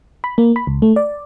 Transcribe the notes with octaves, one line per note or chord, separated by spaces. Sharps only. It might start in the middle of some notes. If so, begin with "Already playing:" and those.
B5
A#3
B5
C#2
A3
D5